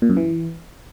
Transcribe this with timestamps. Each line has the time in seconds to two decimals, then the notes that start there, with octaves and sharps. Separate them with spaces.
0.02 A#2
0.09 F#2
0.17 E3